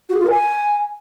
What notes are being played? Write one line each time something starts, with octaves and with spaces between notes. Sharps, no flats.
F#4
G#4
F4
A#4
G#5